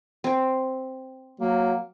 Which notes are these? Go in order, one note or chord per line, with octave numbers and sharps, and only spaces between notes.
C4 G5
F#3 A#3